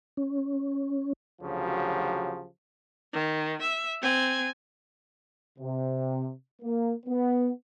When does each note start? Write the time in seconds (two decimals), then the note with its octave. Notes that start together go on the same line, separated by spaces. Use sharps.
0.17 C#4
1.42 D2 C#3 F3 F#3 G4
3.13 D#3
3.61 E5
4.02 C4 G#5
5.59 C3
6.62 A#3
7.06 B3